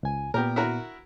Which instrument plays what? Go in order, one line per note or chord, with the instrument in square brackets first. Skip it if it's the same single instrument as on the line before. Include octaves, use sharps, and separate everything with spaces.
[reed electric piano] C#2 G#5
[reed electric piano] A#2 B3 [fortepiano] G4 A#4
[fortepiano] E4 F#4 A#4